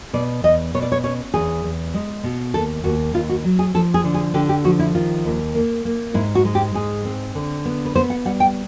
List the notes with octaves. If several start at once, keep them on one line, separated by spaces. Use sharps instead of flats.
B2 D5
E2 D#5
B2 C#5
D5
C#5
C#4 C#5
E2 G#4
E2
G#3
B2
D#2 A4
D#2 F#4
D#2 F4
F#4
F#3
G#4
F3 A4
G#4
D3
G#4
D3 G4
G4
F3 F#4
E4
D#3 F4
D#2
A#3
A#3
G#2 E4
F#4
G#3
G4
G#2 G#4
C4
D3
B3
B4
B3 C5
F#5
G3 F#5
G5